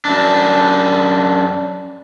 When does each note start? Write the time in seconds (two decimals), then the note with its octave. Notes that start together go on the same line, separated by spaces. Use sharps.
0.05 F#2 D4